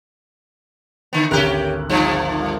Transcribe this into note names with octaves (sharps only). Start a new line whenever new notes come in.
D3 B3
G#1 D2 C#4 G4 A#4 F#6
G2 A#2 F3